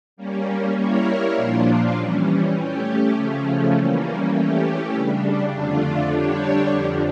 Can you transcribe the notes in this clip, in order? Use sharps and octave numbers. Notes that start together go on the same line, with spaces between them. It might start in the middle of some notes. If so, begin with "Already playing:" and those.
G3 A#3 C#4
G3 A#3 E4 A#4 C#5
A#2 F3 A#3 D4 F4
E3 G3 C#4
A3 C#4 G4
C#3 F3 A3 C#4
E3 G3 A#3 C#4
E3 A3 C#4 G4
C#3 G3 D4
F2 D3 A3 D4 F4
D3 G3 D4 G4 C#5
F2 D3 F3